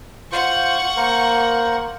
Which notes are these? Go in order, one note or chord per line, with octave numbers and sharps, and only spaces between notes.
F4 C5 F#5 C#6
A#3 A#4 C5